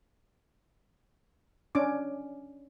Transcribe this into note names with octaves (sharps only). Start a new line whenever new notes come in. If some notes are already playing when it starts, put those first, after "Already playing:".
C#4 D4 D6